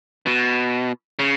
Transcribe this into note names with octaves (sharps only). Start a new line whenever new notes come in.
B2
C#3